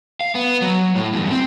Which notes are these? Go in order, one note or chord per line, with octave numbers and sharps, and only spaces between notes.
F5
B3
F#3
A2
E2 G2
C4